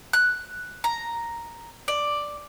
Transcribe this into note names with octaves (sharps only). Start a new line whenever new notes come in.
F#6
A#5
D5